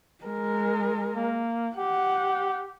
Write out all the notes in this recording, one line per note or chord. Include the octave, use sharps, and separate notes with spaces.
G#3 A#4
A#3
G4 F#5